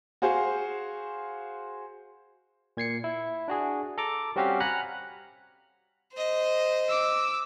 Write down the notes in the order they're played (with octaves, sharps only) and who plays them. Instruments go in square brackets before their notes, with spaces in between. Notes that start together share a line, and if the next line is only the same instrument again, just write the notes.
[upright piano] F#4 G#4 C5 F5
[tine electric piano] A#2 G#6 C7 C#7
E4
D4 F#4 G#4
A4 A#5 D6
G3 C4 C#4 F#4 G4 F5
F#5 G#5 A#5 B5 F6 F#6
[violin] C5 D#5
[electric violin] D6 E6